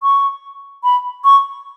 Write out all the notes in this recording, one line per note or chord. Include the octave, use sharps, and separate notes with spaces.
C#6
B5
C#6